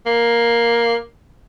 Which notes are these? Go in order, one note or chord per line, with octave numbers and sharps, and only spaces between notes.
A#3